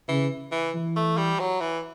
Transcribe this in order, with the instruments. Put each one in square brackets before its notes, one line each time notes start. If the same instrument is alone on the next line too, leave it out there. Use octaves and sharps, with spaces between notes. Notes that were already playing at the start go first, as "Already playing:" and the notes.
[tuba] C#3 [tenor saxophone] E3
[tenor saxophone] E3
[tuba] E3
[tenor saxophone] A3
G3
F#3
E3